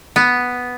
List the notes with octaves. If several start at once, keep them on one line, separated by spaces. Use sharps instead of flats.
B3